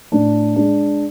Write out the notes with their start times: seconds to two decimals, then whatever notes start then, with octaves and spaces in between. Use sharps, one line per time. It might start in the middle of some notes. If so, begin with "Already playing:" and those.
0.12 A2 D4
0.56 G#3 D4